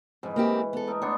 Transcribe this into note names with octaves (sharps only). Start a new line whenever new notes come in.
F2 G#2 E3
A#3 C4 G4
B3 A4
A3 A#4 D#5
B3 D4 C5 C#5